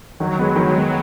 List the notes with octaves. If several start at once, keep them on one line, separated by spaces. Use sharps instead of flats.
D#3 F#3
G#3 B3
D#3
G#3 B3